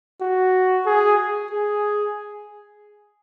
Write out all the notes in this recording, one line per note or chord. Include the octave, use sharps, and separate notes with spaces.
F#4
G#4
G#4